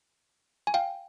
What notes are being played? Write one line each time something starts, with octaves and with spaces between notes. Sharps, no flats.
G#5
F5 G5